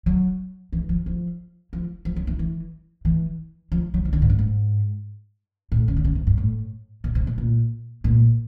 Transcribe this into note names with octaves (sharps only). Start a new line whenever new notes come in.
F#3
E3
F3
F3
F3
F3
F#3
E3
E3
E3
F3
F#3
E3
D3
G#2
G2
G#2
A2
C#3
D3
C#3
C3
G2
A2
B2
C3
B2
A#2
A#2